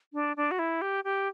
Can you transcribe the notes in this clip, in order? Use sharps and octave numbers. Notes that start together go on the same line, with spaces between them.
D4
D4
F#4
E4
G4
G4